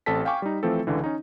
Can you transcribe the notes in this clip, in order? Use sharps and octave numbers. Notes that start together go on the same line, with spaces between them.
A1 C4 A4 A5 B6
F5 G5 G#5 C#6 D6
G3 D#4
E3 F3 A3 C4 A4
C#2 D3 E3
C#4 D#4